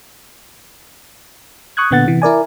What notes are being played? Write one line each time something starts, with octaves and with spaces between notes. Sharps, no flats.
C#6 D#6 F#6 G#6
A#2 D3 B3 F#5 A6
C3 E3
E4 A#4 D5 G#5